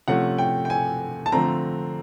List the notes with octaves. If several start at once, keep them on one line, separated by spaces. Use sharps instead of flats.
C3 F3 A3 C#4 F#5
G5
G5
G#5
A5
D3 F3 A3 C4 A#5